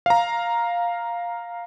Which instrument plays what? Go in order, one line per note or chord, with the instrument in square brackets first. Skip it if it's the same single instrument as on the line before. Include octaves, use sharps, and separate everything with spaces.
[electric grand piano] F5 A#5